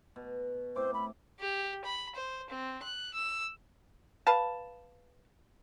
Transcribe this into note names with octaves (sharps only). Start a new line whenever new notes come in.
B2
A2 C4 C5 D6
B5
G4
B5
C5
C4
F#6
E6
B4 F5 A5